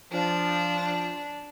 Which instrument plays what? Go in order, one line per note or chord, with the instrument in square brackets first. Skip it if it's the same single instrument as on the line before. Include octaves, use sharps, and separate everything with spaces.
[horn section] F3 [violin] D4